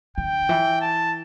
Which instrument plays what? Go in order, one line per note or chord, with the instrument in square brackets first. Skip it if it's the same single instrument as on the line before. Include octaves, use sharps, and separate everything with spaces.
[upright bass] D3 [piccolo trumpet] G5
[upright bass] E3
[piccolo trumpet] A5